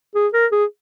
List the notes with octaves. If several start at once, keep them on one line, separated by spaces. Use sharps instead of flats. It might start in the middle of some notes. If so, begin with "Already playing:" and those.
G#4
A#4
G#4